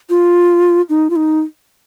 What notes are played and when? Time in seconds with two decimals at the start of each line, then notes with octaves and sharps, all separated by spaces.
0.10 F4
0.89 D#4
1.10 F4
1.16 D#4